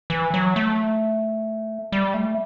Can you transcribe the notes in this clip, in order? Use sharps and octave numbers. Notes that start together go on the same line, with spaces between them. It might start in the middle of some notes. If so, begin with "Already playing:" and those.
E3
F#3
A3
G3
A3